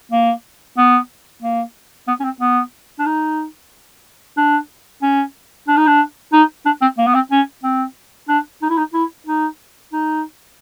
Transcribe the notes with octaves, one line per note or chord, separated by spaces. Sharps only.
A#3
B3
A#3
B3
C#4
C4
B3
D4
D#4
D4
C#4
D4
D#4
D4
D#4
D4
C4
A#3
B3
C4
C#4
C4
D4
D#4
E4
D#4
E4
D#4
D#4